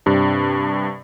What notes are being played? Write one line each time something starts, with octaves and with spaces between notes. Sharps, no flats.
G2 C3 D4